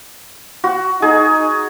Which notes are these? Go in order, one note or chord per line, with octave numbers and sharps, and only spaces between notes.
F#4
D#4 G#4